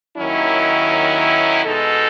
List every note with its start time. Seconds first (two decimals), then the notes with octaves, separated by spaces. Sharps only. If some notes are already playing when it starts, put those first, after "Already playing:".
0.16 D#2 D#3 F#3 C#4 E4
1.64 B2 G#3 D#4 A4